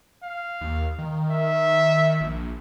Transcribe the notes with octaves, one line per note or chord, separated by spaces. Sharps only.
F5
D#2
D#3
E5
A#1